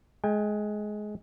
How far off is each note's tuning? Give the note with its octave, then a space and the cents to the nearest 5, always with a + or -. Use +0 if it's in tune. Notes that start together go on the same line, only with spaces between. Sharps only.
G#3 +20 G5 +40